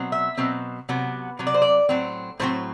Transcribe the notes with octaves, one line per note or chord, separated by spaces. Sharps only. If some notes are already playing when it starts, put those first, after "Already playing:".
Already playing: B2 F#3 C4
E5
B2 F#3 C4
C3 F#3 B3
C3 F#3
D5
C5
D5
A2 F#3 C4
A2 F#3 C4 C5